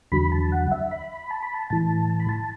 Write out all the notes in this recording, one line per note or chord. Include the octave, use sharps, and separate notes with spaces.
E2 D3 F#3 B5
A5
F#5
E5
B5
A5
B5
A5
A2 E3 A5
A5
B5
A5